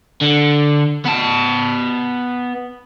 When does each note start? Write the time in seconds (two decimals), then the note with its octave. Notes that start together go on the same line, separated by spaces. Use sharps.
0.21 D3
1.06 B3 A5